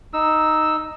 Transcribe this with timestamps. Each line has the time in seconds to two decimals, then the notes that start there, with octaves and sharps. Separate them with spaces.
0.13 D#4 E6